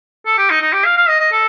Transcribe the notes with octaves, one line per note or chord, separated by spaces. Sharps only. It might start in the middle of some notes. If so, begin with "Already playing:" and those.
A4
G4
D#4
D#4
G4
F5
F5
D#5
D#5
A4